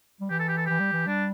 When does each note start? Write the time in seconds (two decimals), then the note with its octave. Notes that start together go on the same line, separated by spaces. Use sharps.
0.21 G3
0.30 E3 G4
0.39 A4
0.48 G4
0.57 A4
0.66 E3 G4
0.80 G3
0.92 E3
1.07 G3 D4